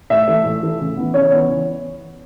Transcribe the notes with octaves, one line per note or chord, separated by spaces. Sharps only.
A2 E5
E3 A3
A2
E3 A3
C#3
E3 B3
C#3 C#5
E3 B3